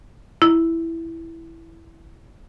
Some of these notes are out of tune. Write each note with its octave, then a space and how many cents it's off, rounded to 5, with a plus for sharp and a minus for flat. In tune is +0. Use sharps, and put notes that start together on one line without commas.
E4 +0